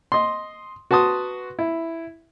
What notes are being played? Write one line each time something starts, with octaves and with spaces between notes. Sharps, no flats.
D#5 C6
F#4 B4 A5 C6 D#6
E4